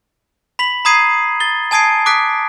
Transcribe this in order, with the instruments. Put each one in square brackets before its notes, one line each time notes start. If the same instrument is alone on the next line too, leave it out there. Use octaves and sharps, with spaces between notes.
[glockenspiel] B5 B6 F#7
A#5 B5 D#6 G#6 C7 D#7
A6 G7
G#5 A5 D#6 G#6 C7 D7
D6 D#6 F#6 B6 D7